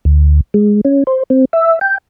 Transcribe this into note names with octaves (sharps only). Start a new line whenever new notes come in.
D2
G#3
C#4
C5
C4
E5
G5